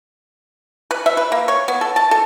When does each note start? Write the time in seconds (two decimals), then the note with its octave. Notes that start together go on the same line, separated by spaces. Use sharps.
0.91 B4
1.06 E5
1.17 B4
1.32 A#3
1.48 C#5
1.68 B3
1.81 A4
1.96 A5
2.11 A4